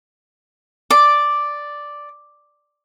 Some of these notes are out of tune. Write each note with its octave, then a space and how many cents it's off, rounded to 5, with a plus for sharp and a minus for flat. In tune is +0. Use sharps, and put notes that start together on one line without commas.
D5 +0 D6 +0